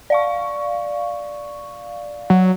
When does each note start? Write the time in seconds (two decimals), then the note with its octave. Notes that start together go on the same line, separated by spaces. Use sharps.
0.10 D5 F5 C#6
2.30 F#3